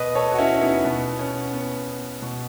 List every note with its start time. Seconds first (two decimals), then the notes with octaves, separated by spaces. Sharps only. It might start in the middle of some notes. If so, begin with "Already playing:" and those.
Already playing: B2 B4 D#5
0.15 A4 C#5
0.32 F#4
0.38 C#4 E4
0.61 B3 D#4
0.84 B2 B3
1.19 C#4
1.53 B3
2.22 B2